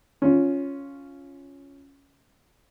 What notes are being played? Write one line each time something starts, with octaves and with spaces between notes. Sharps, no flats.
C#4 F4